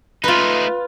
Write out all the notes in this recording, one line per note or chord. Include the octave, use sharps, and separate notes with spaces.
A3 D#4 F4 B4